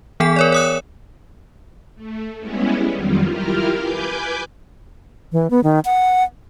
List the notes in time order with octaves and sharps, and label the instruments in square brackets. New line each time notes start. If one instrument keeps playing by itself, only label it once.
[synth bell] E3 B3 G#4 G#5 B6
A#4 C#5 D5
C#5 D#6 F#6
[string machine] A3
G3 G#3 B3 C#4 E4
F2 D#3 F#3 G3 F4
E4 F4 G4 A#4 F5
B4 G#5 D6 G6
[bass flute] E3
B3
D#3
F#5